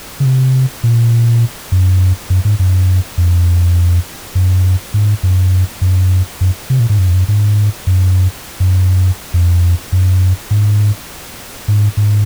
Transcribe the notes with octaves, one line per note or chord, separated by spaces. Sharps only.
C#3
C3
A#2
F#2
F#2
G#2
F#2
F2
F#2
G#2
F#2
F#2
F#2
C3
A#2
G#2
F#2
F2
F#2
G#2
F#2
F#2
F2
F#2
G#2
G#2
G#2